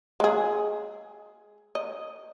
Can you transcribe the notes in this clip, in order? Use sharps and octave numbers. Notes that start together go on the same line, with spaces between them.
G#3 G#4
D#5